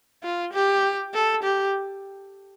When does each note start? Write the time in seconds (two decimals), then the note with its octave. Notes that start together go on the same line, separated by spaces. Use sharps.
0.24 F4
0.53 G4
1.14 A4
1.43 G4